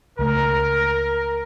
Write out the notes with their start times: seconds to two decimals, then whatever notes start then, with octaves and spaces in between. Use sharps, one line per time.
0.19 C#2 A3 A#4